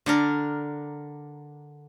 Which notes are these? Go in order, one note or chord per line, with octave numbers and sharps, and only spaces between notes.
D3 D4 A#4